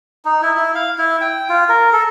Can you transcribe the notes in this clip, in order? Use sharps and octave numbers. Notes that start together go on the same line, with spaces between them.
D#4
E4
E4
F5
E4
G5
F4
A#4
A4